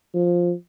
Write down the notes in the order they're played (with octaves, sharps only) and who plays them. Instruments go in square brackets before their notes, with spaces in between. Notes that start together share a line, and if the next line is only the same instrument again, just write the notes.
[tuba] F3